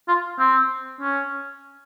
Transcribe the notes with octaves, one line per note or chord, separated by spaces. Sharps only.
F4
C4
C#4